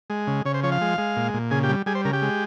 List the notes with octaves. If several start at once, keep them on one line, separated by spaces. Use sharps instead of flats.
G#3
C#3
C#3 C#5
C5
F3 C#5
F5
G#3
G#3
A#2
A#2
C#3 G#4
G4
G3
G3 G#4
C5
C#3 A#4
G4
G#3